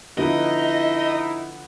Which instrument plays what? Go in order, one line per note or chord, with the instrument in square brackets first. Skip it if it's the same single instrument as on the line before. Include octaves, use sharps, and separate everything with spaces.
[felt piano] D3 F3 B3 [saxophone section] D#4 E4 [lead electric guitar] D#5